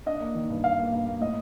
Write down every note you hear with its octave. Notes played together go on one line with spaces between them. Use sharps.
D4 D#5
A#3
D#3
G2
G2 F5
A#3
G2
A#3
A2 D#5